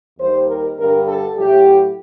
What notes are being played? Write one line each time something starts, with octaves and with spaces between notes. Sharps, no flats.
D#2 D#3 G3 C5
A#4
G2 D3 G3 A#4
A4
A2 F#3 A3 G4